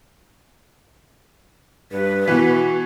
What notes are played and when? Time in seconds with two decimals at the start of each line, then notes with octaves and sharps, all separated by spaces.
1.92 G2 B4
2.28 B2 E3 F#4